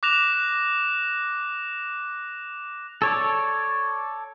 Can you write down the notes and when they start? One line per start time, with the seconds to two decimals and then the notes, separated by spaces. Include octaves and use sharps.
0.03 D6 F#6 A#6 E7 F7
3.02 A4 C#5 D5